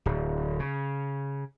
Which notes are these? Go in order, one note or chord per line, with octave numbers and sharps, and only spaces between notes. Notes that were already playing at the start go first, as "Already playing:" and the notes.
D1
C#3